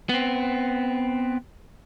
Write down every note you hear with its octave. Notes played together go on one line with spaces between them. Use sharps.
B3 C4